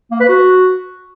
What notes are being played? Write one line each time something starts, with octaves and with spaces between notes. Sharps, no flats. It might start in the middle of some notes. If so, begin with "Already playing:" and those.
A#3
B4
F#4